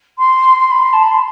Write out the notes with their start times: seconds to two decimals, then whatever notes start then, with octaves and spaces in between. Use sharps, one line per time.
0.18 C6
0.60 C6
0.71 B5
0.82 C6
0.93 A5
1.03 B5
1.11 C6